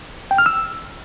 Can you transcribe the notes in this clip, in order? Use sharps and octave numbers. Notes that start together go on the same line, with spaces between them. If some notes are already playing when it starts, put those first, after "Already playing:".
G5
F6
E6